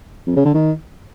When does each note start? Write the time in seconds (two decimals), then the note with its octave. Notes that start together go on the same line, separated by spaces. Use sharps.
0.27 F2
0.36 C#3
0.45 D3
0.55 D#3